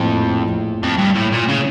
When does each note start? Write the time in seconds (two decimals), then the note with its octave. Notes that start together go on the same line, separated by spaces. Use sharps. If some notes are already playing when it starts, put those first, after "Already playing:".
Already playing: A#1 F2 A2 F3 A3
0.83 F2
0.99 G2
1.16 A2
1.33 A#2
1.49 C#3